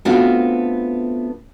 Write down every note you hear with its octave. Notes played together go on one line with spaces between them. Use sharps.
A3 B3 C4 D4 F4 F#4